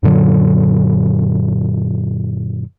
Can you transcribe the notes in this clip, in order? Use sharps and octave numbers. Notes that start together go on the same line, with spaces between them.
F#2 A#2 D3 F#3